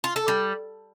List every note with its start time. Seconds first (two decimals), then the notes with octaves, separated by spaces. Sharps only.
0.04 F4
0.16 A4
0.28 G3